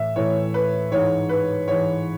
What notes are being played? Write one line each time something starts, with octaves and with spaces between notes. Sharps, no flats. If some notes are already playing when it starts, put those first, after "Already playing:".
Already playing: A2 E3 E5
A2 E3 C#5
B4
G#2 E3 C#5
B4
G#2 E3 C#5